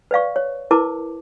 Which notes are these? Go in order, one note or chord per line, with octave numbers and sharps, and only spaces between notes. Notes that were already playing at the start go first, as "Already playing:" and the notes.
B4 D5 F5 C#6
C#5
E4 A#4 B4 A5 D6